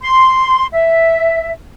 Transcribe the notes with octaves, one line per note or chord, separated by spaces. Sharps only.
C6
E5